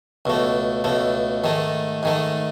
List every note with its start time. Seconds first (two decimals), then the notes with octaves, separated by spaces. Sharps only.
0.25 C#2 B2 A3
0.84 C#2 B2 A3
1.44 G#2 D#3 A3
2.03 G#2 D#3 A3